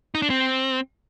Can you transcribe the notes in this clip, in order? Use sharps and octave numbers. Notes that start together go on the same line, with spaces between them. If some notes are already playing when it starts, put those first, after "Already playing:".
D#4
D4
C4